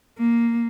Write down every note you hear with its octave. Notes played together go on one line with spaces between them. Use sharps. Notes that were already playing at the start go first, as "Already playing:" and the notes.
A#3